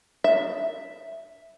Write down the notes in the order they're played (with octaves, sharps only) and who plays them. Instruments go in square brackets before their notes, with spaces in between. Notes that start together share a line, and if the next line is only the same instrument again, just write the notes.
[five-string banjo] E5